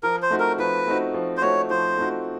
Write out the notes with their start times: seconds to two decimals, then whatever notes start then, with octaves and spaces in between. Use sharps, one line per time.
0.03 F3 A#4
0.22 C5
0.30 A3 C4 D#4 F#4
0.40 A#4
0.59 F3 B4
0.86 A3 C4 D#4 F#4
1.14 F3
1.37 C5
1.42 A3 C4 D#4 F#4 C#5
1.70 F3 C5
1.97 A3 C4 D#4 F#4